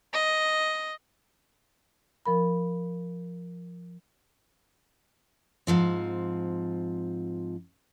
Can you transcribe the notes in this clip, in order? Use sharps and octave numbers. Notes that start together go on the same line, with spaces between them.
D#5
F3 A#4 B5
G#2 F3 C4